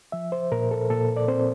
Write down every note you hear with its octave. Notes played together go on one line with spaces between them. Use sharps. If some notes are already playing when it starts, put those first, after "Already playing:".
F3 E5
C5
A#2 A#4
A4
A#2 A4
D5
C4 C5